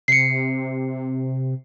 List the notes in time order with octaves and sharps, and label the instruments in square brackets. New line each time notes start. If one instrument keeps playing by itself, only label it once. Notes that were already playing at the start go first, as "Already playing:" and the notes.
[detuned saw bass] C3 [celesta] C7 C#7